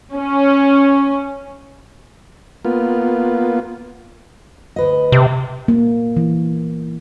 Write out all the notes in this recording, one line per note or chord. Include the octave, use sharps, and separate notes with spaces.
C#4
A#3 B3 F4
D2 B4 D#5
C3
A#3
E3